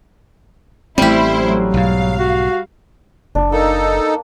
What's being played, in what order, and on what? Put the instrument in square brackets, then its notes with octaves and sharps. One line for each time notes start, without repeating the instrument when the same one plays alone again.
[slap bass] A1 C4 [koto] G3 G4 [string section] A3 E4 C5
[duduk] F#3
[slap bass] B1 G#2 [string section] F5
[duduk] F#4
[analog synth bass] F#1 [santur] D4
[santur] A#3 [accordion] D#4 A4